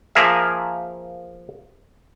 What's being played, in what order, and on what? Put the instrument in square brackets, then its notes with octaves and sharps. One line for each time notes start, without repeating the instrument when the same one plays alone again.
[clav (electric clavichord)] F3 A#3 G#4 A#4 E5